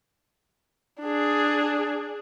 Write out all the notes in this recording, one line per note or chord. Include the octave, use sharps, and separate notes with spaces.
D4 G#4